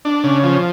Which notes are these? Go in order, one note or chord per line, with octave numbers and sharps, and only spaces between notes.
D4
C#3
F3